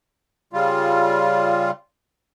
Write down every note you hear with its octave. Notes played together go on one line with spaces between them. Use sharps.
C#3 G3 F4